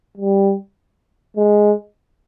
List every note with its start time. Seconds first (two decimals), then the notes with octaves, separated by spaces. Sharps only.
0.18 G3
1.37 G#3